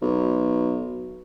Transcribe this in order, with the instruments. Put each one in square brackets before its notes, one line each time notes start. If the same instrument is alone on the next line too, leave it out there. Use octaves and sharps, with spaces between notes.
[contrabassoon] B1